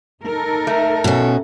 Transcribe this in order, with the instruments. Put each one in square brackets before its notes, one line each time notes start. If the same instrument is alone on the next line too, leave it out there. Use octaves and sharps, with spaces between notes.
[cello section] D#4 A4 A#4
[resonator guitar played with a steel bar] A3
[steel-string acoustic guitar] B2 C#4